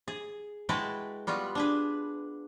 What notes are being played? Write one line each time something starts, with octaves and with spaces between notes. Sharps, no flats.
G#4
G#3 E4 F#4 B4 G5 A5
G3 B3 F4 F#4
D4 G#4 B4